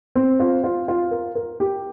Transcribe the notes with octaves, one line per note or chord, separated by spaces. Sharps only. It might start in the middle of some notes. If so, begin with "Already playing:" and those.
C4
F4
F4
F4
A#4
A#4
G4